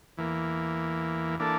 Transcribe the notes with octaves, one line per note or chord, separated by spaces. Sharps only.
E2 E3 A#3
E3 A#3 D4 A4